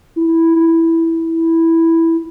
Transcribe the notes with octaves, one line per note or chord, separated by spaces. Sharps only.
E4
E4